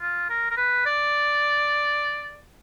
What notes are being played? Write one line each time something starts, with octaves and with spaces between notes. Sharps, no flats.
F4
A#4
A#4
B4
D5